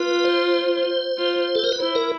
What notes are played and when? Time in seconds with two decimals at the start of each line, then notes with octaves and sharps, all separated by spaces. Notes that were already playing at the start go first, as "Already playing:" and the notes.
Already playing: F4 B4
0.24 C5
1.18 F4
1.55 A4
1.64 A#4
1.72 B4
1.80 E4 C5
1.95 A#4